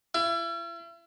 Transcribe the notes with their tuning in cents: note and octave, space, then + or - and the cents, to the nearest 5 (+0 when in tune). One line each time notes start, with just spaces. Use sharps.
E4 +40